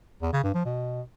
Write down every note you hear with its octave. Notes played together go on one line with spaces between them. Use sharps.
E2
C#3
G2
F3
B2